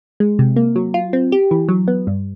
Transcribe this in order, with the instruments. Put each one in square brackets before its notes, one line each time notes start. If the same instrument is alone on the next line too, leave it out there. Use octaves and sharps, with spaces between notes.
[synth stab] G#3
C3
A#3
F#3
F4
C4
G4
E3
F#3
B3
G2